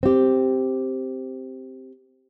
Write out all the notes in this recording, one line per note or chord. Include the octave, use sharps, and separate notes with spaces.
C4 G4